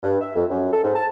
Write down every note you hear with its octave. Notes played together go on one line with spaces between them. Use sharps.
G2
E5
F2
F#2
A4
G#2
A5